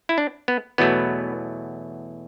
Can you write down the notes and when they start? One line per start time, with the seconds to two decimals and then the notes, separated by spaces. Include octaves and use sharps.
0.09 E4
0.18 D4
0.48 B3
0.78 E2 B2 F#3 A3 B3